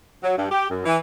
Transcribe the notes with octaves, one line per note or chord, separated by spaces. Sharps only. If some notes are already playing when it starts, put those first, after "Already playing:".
F#3
G2
G4
F#2
E3